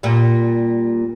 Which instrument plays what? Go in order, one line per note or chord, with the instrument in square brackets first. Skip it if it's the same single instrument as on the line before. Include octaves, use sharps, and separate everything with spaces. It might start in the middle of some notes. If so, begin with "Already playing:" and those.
[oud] A#2 G3